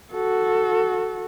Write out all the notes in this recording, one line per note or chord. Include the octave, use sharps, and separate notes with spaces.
F#4 A4